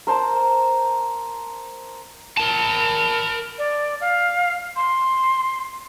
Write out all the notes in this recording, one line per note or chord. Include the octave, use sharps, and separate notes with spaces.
A#4 C5 A5 A#5
A#4 A5
D5
F5
C6